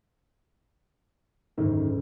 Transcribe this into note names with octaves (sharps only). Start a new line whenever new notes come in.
F#1 D2 G#2 D#3